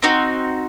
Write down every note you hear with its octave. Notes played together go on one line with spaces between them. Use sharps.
C4 D#4 F#4